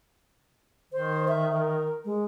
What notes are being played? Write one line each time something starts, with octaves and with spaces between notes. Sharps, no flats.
D#3 C5
E5
A#4
G#3